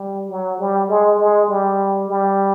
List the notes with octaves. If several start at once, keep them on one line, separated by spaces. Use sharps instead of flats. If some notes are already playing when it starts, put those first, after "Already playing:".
Already playing: G3
F#3
G3
G#3
G#3
G3
G3